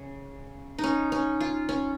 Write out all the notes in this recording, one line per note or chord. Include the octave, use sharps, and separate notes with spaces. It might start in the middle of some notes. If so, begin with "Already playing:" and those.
Already playing: C#3
D#4
C#4
C#4
F4
C#4